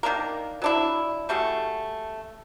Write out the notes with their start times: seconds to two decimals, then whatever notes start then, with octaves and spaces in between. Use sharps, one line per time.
0.03 D#3 A#3 D4 A#4
0.62 F#3 D4 E4
1.29 G3 A3 F#4 G#4